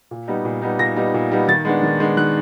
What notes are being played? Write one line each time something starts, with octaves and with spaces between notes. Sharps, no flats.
A#2
G3 B3 D#4
A#2
G3 B3 D#4
A#2 A#6
G3 B3 D#4
A#2
G3 B3 D#4
D#3 A6
G#3 B3 D4
D#3
G#3 B3 D4
D#3 F#6